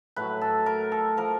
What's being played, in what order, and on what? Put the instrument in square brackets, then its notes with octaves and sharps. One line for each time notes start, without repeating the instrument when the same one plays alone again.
[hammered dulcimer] A2 F#3 B4
A4
A#4
A4
F3 A#4